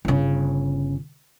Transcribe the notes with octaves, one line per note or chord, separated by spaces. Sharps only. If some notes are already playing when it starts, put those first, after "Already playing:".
G1 C#3